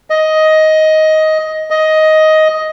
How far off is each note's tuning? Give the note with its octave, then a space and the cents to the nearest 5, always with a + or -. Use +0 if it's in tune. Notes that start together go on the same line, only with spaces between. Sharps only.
D#5 +10
D#5 +10